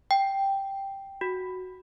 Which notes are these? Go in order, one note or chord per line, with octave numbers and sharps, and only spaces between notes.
G5
F#4